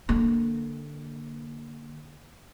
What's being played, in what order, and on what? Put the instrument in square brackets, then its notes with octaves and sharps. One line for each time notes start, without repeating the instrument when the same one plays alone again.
[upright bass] D3 A#3